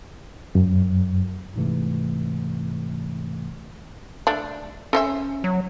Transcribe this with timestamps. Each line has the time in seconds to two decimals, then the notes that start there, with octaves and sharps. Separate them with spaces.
0.55 F#2
1.56 G#2 C3 E3 A3
4.27 A3 D4
4.93 C#4 A4 C5 E5
5.44 F#3